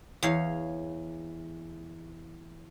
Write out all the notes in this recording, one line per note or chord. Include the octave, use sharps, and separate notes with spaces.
E2 C#5 F5